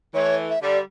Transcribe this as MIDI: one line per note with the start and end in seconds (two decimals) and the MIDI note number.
0.14 0.53 52
0.14 0.53 57
0.14 0.35 73
0.49 0.59 76
0.62 0.79 50
0.62 0.79 55
0.62 0.78 74